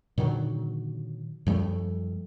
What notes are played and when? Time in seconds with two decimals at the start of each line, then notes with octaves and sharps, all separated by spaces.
0.18 A#2 D3 D#3 F#3
1.46 F#2 F3 G3 A3